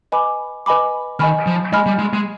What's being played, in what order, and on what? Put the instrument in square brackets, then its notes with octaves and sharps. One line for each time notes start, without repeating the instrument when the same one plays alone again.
[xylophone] B4 D#5 G#5 B5 D6
B4 D#5 G#5 B5 D6
[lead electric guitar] D#3 [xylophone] D#5 G#5 B5 F6
[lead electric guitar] F3
[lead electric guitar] G#3 [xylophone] D#5 G#5 B5 F6
[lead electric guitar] G3
G#3
G#3